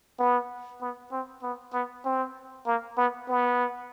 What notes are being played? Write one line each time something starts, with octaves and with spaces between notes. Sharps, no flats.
B3
B3
C4
B3
B3
C4
A#3
B3
B3